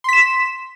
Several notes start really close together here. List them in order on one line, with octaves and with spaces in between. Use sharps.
C6 B6 E7